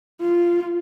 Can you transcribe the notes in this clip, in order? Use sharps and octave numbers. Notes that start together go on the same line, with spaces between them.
F4